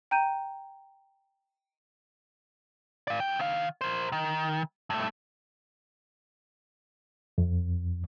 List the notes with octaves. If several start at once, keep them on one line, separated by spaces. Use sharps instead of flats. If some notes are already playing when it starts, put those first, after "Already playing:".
G5 A#5 G6 D#7
D5 F5
F2 G5
D#3 F5
A#4 C5
D#3
G2 A3
F2